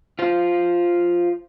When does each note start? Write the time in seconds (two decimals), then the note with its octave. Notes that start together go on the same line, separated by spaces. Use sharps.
0.19 F4 C5